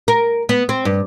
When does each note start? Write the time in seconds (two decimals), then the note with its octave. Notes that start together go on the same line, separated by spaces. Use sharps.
0.08 A#4
0.49 B3
0.69 C4
0.85 G2